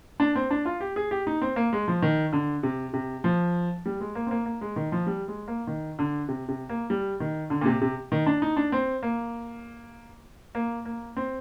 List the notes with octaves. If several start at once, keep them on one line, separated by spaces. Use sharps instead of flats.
D4
C4
D4
F4
G4
G#4
G4
D#4
C4
A#3
G#3
F3
D#3
D3
C3
C3
F3
G3
G#3
A#3
C4
A#3
A#3
G#3
D#3
F3
G3
G#3
A#3
D#3
D3
C3
C3
A#3
G3
D#3
D3
A#2
C3
C3
D#3
D4
D#4
D4
C4
A#3
A#3
A#3
C4